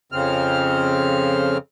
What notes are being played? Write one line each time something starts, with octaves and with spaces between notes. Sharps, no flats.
F2 C#3 C4 F6